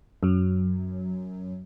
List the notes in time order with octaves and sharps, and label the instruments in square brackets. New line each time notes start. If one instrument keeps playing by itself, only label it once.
[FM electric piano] F#2 F#3